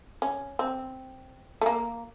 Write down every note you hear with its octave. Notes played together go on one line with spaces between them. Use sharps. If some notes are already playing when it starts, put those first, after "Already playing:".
C#4
C4
A3
A#3